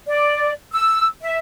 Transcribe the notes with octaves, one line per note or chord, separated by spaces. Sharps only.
D5
E6
E5